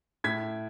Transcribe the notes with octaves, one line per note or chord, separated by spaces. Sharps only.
A2 G#6 B6